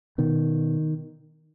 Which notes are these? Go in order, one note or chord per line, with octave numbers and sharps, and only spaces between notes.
B2 D#3